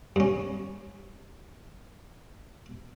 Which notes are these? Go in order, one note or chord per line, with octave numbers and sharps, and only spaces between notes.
G2 C#4